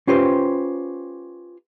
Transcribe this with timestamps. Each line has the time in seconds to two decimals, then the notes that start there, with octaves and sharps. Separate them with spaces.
0.07 C#4 F4 G4 B4 C5